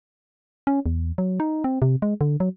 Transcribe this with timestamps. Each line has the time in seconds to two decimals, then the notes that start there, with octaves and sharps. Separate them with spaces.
0.67 C#4
0.86 E2
1.18 F#3
1.40 D#4
1.64 C4
1.82 C3
2.02 G#3
2.21 D3
2.40 F#3